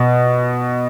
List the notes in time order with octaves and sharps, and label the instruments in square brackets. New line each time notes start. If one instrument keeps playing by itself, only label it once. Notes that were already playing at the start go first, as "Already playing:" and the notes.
Already playing: [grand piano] B2